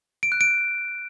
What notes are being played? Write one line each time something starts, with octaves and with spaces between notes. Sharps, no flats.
D7
F#6
D7